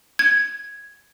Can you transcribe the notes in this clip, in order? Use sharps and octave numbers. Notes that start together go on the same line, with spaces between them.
G#6